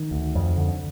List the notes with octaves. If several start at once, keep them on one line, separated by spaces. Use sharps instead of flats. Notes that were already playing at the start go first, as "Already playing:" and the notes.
Already playing: D#3
D2
F2
D3